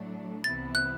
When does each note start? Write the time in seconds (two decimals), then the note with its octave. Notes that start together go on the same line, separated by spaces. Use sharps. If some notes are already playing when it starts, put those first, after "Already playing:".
Already playing: A2 F#3 A3 D4
0.44 C2 C3 E3 B3 E4 A6
0.75 F#6